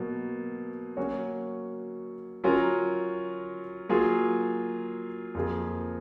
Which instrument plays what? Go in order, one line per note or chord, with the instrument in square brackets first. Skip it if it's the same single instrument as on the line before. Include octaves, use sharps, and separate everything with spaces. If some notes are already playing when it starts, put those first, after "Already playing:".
Already playing: [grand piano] B2 F#3 A#3
F#3 A#3 C#4 F#4 C#5
F#3 C#4 F4 A#4
F#3 A#3 F4 G#4
F2 F3 A#3 F4 G#4